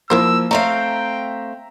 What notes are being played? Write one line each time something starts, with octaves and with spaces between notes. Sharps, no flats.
F3 A#3 E4 A#4 C5 E6
A3 C4 E5 F5 G5 A#5